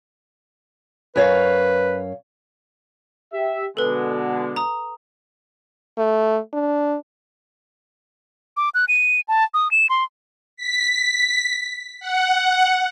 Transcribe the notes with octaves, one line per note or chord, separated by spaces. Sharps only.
F#2 B4 C#5 F5
G4 E5
B2 D3 G#3 A4 B4
A#5 D#6
A3
D4
D6
F#6
D#7
A5
D#6
E7
C6
B6
F#5